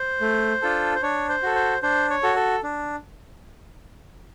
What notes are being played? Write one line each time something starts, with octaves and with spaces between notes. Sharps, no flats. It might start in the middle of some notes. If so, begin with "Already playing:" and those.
Already playing: C5
A3
D4 F4 A4
C5
D4 C#5
C5
F#4 A4
C5
D4 C5
C#5
F#4 A4
A4
D4